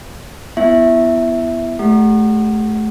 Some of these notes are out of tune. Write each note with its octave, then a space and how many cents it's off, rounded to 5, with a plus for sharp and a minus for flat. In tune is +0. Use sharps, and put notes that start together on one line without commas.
B3 +0 E4 +20 E5 +0
A3 -25 G4 +10 F#5 +10